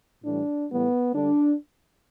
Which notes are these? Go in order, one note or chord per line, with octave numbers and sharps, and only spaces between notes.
A2 E3 G3 D4
A2 E3 G3 B3
D3 G3 D4